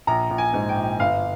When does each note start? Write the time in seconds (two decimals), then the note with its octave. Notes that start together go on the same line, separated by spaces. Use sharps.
0.07 A#1 A#5
0.31 A#1
0.38 G#5
0.54 G#2
0.69 G5
0.77 A#1
1.00 G1 F5